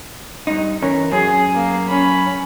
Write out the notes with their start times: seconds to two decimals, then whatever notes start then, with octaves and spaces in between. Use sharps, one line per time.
0.47 G2 D#4
0.82 E3 C#4 A#4
1.12 F#2 G#4
1.55 A#3
1.88 C#4 B5